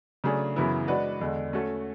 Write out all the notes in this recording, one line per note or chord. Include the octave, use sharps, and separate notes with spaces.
C#3 F#3 A3 D4 G#4
F#2 C#3 E3 B3 E4
G#3 D4 F#4 B4 D5
E2 D3 G#3
A3 C#4 F#4 A4